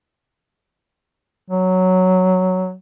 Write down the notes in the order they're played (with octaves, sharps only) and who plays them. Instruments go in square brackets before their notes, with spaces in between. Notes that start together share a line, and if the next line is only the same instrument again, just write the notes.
[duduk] F#3